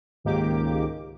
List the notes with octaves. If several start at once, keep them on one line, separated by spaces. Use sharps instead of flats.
C#2 G#2 D#3 A#3 G4 D6